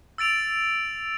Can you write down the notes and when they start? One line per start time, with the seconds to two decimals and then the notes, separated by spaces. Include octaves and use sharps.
0.18 E6 A6 D7 F7